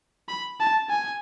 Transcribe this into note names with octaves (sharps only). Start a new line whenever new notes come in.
B5
A5
G#5